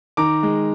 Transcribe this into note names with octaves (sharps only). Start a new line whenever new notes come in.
D#3 A#5 D6
G#3